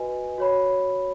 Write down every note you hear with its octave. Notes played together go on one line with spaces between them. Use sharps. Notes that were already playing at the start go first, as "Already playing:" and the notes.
Already playing: F#4 B4 D#5 G#5
F#4 C#5 B5